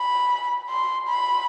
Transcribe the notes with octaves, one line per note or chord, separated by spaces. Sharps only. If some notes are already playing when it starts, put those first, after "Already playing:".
Already playing: B5
C6
B5